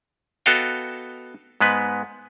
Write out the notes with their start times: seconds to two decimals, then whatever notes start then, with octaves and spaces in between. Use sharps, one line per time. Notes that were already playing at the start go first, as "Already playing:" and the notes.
0.46 B3 F#4 A4 D#5 F5 G5
1.61 G#2 G#3 B3 B4